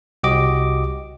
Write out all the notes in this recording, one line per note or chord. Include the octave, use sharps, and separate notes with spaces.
C2 F#4 G4 D#5 D6